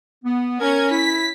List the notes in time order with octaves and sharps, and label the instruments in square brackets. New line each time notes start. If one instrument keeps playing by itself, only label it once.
[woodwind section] B3
[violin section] C#4 G#6 [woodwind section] A#4
[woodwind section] E4 [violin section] B6